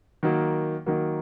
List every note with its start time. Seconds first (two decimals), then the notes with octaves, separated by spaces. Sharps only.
0.23 D#3 F#3 A#3
0.86 D#3 F#3 A#3